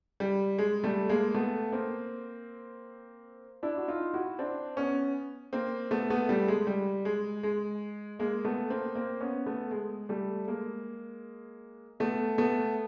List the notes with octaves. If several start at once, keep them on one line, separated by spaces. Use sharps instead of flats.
G3
G#3
G3 A3
G#3 A#3
A3 B3
A#3 C4
D4 E4
F#4
D#4 F4
E4 F#4
C4 D4
B3 C#4
A#3 C4
A3 B3
A3 B3
G3 A3
G#3
G3
G#3
G#3
G#3 A#3
A3 B3
A#3 C4
A#3 C4
B3 C#4
A3 B3
G#3
G3 A3
G#3 A#3
A3 B3
A3 B3